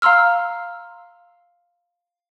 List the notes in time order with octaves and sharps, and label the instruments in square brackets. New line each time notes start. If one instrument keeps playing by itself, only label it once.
[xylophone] F5 A#5 C6 E6 F6